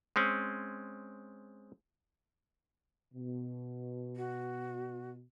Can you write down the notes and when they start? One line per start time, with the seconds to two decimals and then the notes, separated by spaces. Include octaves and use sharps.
0.16 G#3 C4 C#4
3.14 B2
4.16 F#4